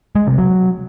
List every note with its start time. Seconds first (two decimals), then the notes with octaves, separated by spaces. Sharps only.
0.15 G#3
0.27 C3
0.38 F#3